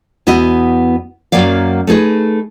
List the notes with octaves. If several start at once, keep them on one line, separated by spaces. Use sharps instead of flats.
E2 B3 E4 F#4 D#5
F#2 C3 F#3 A#3 D5 F5
A3 D#4 G#4 B4